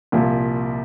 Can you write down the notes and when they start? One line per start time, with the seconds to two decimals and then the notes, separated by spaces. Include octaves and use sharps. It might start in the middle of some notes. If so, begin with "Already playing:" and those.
0.12 C2 A#2 F3